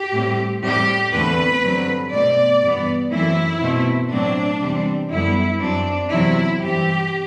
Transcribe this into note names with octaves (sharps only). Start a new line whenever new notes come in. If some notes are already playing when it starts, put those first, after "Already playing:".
Already playing: G4
A2 G3 C4
A2 G3 C4 G4
E2 D3 A3 C4 B4
G2 D3 F#3 C4
B2 A3 C4 D5
G2 E3 B3
F#2 E3 A3 C4 E4
B2 A3 C4
A2 F#3 A3 C4 D4
E2 C3 G3 C4
F#2 D3 G3 B3 E4
F#2 F#3 C4 D4
E2 C3 F#3 C4 E4
G2 E3 G3 C4 G4